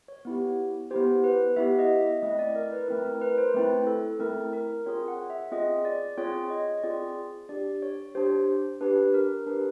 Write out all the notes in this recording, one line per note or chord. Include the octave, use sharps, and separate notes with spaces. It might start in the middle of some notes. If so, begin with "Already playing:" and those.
C#5
B3 E4 G4
B3 E4 G4 C5
B4
B3 E4 G4 E5
D#5
E5
A3 C4 E4 D#5
D5
A#4
B4
A3 C4 E4 A#4
A#4
B4
C5
A3 C4 E4 B4
A4
A3 C4 E4 A#4
A#4
C4 F4 G#4 C#5
F#5
E5
C4 F4 G#4 D#5
D5
C4 F4 G#4 C#5
D#5
C4 F4 G#4 D5
D4 G4 D5
C#5
D4 G4 C5
D4 G4 B4
A#4
D4 G4 B4